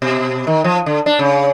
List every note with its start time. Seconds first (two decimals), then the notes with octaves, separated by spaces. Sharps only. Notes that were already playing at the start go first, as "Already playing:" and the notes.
0.02 B2
0.47 D#3
0.64 F3
0.86 D3
1.06 D4
1.19 C#3